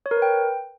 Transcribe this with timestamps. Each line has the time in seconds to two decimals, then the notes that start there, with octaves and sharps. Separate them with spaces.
0.06 C#5
0.11 A#4
0.17 B4
0.22 G5